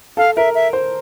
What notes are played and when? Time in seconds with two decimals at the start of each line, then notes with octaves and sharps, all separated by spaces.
0.17 A4 F5
0.36 A#4 E5
0.55 E5
0.73 C5